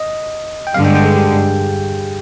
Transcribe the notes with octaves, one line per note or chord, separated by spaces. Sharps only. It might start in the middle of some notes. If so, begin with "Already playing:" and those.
Already playing: D#5
G5
G2 D3 G#3 F5
G5
G5
G#4
G4